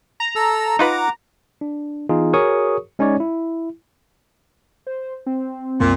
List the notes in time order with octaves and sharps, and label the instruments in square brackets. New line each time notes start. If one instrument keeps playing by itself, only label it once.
[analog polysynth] A#5
[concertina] A4 E6
[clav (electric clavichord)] D#4 F4 B4 [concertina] F#5 D6
[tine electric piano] D4
E3 B3 D#4 F4 G#4
F#4 G#4 A#4 C#5 C#6 D#6
G#3 C#4 D#4 C#5 D5
E4
[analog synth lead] C5
C4
[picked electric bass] C2 F#2 A#3 [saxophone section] A#2